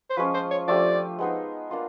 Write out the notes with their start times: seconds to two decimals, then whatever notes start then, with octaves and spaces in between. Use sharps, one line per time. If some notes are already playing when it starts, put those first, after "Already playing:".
0.10 C5
0.17 F3 G#3 C#4 F4 B4
0.34 C5
0.51 C#5
0.68 F3 A3 D4 G4 D5
1.19 G#3 B3 D#4 G#4
1.71 A#3 D4 F4